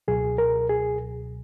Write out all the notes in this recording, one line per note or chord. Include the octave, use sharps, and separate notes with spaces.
C#2 B2 F#3 G#4
A#4
G#4